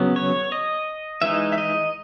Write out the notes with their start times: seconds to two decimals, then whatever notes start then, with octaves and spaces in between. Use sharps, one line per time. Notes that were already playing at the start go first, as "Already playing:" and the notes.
Already playing: C#3 F#3 B3
0.16 C#5
0.52 D#5
1.22 E3 G#3 D#4 E5
1.52 E5
1.58 D#5